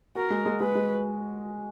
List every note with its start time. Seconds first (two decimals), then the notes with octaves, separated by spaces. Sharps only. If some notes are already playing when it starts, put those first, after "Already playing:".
0.15 F#4 A#4
0.30 G#3
0.46 G#3
0.60 G#3 B4
0.75 G#3